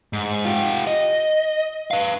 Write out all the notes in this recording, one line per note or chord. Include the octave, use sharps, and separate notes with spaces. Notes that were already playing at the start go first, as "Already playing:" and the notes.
G#2
F4 G4
D#5
B4 F5